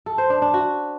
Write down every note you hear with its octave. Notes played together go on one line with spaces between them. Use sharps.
A4
C5
D4
D4
F#4